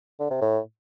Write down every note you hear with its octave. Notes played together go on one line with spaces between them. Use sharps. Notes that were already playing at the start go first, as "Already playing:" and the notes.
D3
C3
A2